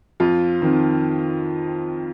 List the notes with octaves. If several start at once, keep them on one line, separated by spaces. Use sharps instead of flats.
F2 F4
D#3 C4